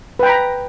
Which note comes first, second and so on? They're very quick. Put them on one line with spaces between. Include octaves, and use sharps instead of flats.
B4 G5 B5 A#5